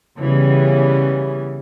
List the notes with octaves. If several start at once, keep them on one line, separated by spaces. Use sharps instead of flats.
C#3 E3 G3 B3